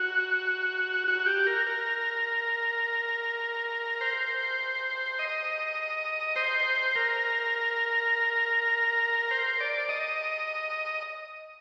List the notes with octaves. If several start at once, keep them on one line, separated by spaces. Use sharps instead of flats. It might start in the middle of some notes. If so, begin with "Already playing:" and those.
Already playing: F#4
F#4
G4
A#4
A#4
C5
D#5
C5
A#4
C5
D5
D#5